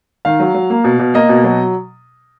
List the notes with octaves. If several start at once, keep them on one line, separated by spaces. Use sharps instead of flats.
D#3 F5
F#3
F#3
A#3
B2
B2
A#3 D#5
B2
F#3